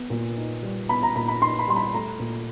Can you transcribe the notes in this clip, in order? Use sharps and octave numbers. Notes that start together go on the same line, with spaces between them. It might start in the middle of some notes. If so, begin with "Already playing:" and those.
Already playing: B3
A#2
D#4
G3
B3 B5
A#5
A#2 B5
B5
D#4 C6
B5
G3 C6
B5
A3 A#5
A#2